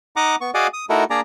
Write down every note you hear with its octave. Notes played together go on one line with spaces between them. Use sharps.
D#4 D#5 F#5 A#5 D6
B3 C#6
F#4 G#4 D5 D#5 F5 F#5
D#6
A3 D#4 E4 F#4 A4 A#4
A#3 D4 G#4 D5 A#5